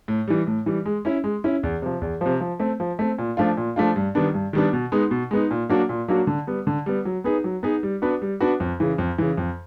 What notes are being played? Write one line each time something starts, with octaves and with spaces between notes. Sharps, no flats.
A2
E3 G3
A2
E3 G3
G#3
C#4 E4
G#3
C#4 E4
E2
C3 F3
E2
C3 F3
F3
A3 C4
F3
A3 C4
A#2
F3 A3 D4 F4
A#2
F3 A3 D4 F4
G2
D#3 G3 B3 D4
G2
D#3 G3 B3 D4
B2
G#3 B3 D#4
B2
G#3 B3 D#4
A#2
F#3 A#3 D4 F#4
A#2
F#3 A#3 D4 F#4
D3
G3 B3
D3
G3 B3
F#3
B3 D#4 G#4 B4
F#3
B3 D#4 G#4 B4
G3
B3 D4 F#4 B4
G3
B3 D4 F#4 B4
F2
C#3 E3
F2
C#3 E3
F2